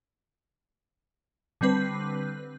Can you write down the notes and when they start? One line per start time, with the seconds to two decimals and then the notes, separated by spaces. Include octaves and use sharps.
1.61 D3 G3 C4 B4